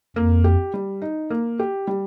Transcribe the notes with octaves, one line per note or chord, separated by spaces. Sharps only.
F2 A#3
G4
G3
D#4
A#3
G4
G3